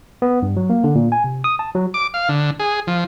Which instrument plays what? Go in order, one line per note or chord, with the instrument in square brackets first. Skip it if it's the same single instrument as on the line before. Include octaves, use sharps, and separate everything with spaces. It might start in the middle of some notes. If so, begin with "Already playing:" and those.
[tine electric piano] B3
G2
F#3
A#3
D3
A#2
G#5
C3
D#6
A5
F#3
[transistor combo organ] D6
F5
D3
G#4
F3